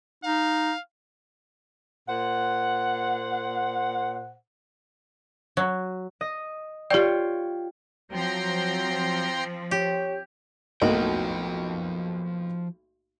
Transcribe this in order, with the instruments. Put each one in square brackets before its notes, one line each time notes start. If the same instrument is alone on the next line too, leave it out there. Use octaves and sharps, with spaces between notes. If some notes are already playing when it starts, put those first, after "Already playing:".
[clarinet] D#4 [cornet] F5
[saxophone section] A#2 C5 F#5
[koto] F#3
[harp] D#5
[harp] F4 C#5 G5 [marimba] G4 D5
[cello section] F3 C4 [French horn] F#3 [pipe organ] G5 A#5 C6
[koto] G4 [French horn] C#5
[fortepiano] B1 A2 A#3 [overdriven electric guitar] F3 G5 [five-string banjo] D#4 F#4